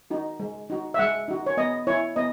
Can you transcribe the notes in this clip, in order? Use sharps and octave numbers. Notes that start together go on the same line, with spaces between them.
D#4 F#4
G#3
D#4 F#4
E5
G#3 F#5
D#4 F#4
C#5
B3 D#5
E4 C#5
B3 D#5